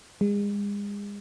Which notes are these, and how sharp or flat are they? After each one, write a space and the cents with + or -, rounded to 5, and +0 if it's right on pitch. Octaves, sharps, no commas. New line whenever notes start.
G#3 -35